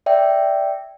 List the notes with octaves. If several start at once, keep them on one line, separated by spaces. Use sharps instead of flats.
D5 E5 G5